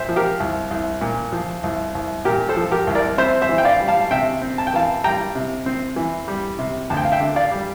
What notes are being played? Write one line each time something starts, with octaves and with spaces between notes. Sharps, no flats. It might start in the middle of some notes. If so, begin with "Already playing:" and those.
Already playing: A#2 C5 E5
F3
G4 A#4
C2
C2
A#2
F3
C2
C2
A#2 G4 A#4
A4 C5
F3
G4 A#4
C2
A#4 D5
C4 C5 E5
C5 E5
E3
G5
D5 F5
G3
F5 A5
C3 E5 G5
C4
A5
G5
E3 F5 A5
G3 G5 A#5
C3
C4
E3
G3
C3
D2 A5
G5
F5
E5 G5
D3
D5 F5
G3